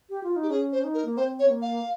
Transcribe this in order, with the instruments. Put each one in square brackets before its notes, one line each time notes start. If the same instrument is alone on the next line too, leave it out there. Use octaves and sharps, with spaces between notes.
[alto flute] G4
F4
D#4
[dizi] G4
[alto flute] C#4 [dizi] G#4
[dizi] C5
[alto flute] C#4
D#4
[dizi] A#4
[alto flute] A#3
[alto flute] C4 [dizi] C5
[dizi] C#5
[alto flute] C4
A#3
[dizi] F5